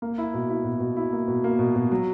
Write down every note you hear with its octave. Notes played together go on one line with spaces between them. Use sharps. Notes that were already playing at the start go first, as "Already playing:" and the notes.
A#3
E4
B2
E4
B2
B2
E4
A#3
B2
A#3
B2
B2
F#3